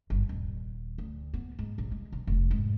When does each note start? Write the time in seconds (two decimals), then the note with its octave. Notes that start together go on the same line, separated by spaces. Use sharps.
0.10 G1
0.29 D#1
0.98 D2
1.34 B3
1.59 G#2
1.78 A#1
1.91 G#3
2.12 B1
2.27 F1
2.51 G#2